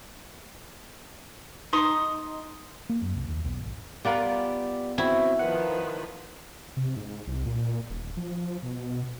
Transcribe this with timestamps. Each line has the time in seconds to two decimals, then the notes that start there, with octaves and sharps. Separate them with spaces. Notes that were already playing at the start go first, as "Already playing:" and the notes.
1.73 D#4 C6 D#6
2.89 A#3
3.02 F#2
3.15 C2
3.28 D#2
3.45 B1
3.58 G#1
4.05 B3 F4 G4 A#4 D5
4.98 C4 E4 F#4
5.39 D#3 F3 B4 F#5
6.77 C3
6.96 G#2
7.27 C2
7.46 A#2
7.90 D#1
8.17 F3
8.63 B2